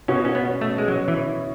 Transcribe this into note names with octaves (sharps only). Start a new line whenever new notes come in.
B2 C#4
B2 C#4
B3
C#4
A3
C#4
G#3
F#3 C#4
E3 E4
E4